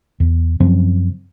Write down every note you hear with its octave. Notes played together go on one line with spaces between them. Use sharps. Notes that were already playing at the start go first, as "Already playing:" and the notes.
E2
F#2 C#3 F3 C4